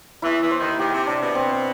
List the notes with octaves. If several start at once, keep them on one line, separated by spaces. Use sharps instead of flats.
E2 E3 E4
E2 E3
C5
D#2 D#3
D#2 D#3 G4
C3
C3 D4
B2
C4